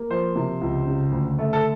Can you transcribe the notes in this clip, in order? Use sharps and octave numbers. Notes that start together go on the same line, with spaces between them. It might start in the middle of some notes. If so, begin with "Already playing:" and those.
Already playing: A#3
F3 C5
C3
C#2
C#3
D2
A3
A4